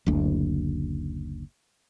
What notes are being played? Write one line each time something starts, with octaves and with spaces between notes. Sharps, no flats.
F#1 D2